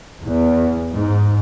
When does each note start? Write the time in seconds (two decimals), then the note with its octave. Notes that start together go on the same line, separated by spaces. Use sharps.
0.23 E2
0.93 G#2